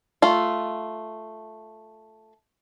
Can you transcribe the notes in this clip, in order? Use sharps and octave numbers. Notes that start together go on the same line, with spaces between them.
A3 F4